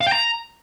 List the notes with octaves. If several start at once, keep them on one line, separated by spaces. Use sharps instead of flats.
F5
G5
A#5